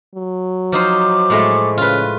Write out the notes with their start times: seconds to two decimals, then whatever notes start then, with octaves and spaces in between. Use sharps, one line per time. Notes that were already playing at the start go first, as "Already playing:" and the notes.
0.15 F#3
0.72 F3 D#4 C5 D6
1.30 A2 G#3 A3
1.78 C#3 F4 B4